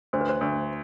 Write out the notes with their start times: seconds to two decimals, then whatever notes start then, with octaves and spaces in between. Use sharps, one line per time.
0.13 D2 C5
0.21 B4
0.30 C5
0.41 D2